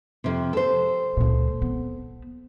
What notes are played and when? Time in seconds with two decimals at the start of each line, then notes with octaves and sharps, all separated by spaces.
0.24 F2 C3
0.53 A4 C5
1.17 C#2 A#2
1.62 B3 C4